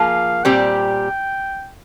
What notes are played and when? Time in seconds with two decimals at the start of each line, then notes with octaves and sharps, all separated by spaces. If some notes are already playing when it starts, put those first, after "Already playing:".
Already playing: F3 A#3 F4 G#4 F5
0.44 A#2 G3 C4 G4 G5